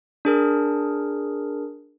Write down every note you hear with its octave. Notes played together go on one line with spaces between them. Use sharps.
D4 G#4 A#4